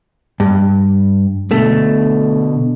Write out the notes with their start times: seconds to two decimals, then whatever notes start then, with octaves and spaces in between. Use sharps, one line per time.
0.40 G2
1.51 B2 D3 A3